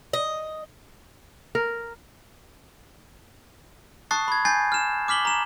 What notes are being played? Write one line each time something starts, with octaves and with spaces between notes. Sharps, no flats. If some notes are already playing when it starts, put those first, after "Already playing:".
D#5
A#4
A5 C#6 D#6 F#6 A6 C7
B5 G#6
G#5 G6 A6 C7
F6 E7
D6 F6 B6 F#7 G7
A#5 E7